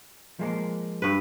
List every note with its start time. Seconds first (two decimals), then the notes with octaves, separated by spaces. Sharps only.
0.39 F3 G#3 A#3
1.02 G2 B4